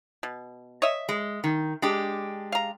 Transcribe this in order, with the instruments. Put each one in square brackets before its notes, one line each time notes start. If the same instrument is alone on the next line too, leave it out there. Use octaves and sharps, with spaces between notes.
[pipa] B2
C#5 D#5 E5
[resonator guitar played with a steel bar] G#3
D#3
G#3 D4 G4
[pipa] F5 A#5